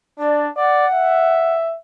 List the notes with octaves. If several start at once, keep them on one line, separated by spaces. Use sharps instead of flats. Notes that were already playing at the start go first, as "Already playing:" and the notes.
D4 D5
D5 F#5
E5